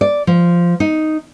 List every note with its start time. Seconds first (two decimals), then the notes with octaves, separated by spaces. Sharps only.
0.01 D5
0.27 F3
0.80 D#4